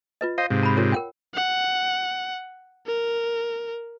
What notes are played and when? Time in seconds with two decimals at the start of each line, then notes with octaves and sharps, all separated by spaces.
0.21 F4 B4 D#5
0.38 C5 D#5 F5
0.50 G#2 C3
0.63 A#5 B5
0.77 F4 A#4 C#5
0.92 A#4 F#5 G5
1.34 F#5
2.86 A#4